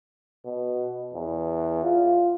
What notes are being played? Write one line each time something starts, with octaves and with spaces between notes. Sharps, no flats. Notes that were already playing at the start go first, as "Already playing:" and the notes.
B2
E2
F4